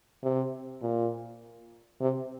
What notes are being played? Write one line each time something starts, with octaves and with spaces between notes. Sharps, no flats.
C3
A#2
C3